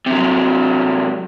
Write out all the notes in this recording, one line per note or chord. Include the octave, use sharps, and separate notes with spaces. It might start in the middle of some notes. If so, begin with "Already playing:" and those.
C3 F#3